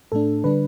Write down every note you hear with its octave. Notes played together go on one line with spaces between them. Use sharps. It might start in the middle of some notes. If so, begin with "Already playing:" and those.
A2 A3 D4 A4
D3 G3 D4 B4